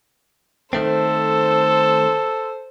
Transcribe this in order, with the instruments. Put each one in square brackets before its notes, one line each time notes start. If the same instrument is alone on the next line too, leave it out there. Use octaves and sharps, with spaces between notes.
[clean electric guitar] D#3 A3 C4 [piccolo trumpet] A4 [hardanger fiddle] C5